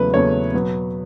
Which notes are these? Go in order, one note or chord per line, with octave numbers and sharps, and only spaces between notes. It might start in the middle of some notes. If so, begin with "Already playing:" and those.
Already playing: E2 C#3 F#3 A3 B4
E2 C#3 F#3 A3 C#5
B2 F#3 B3